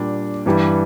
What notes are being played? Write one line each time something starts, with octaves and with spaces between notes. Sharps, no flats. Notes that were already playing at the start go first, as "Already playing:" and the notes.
Already playing: A#2 G3 D4
G2 E3 G3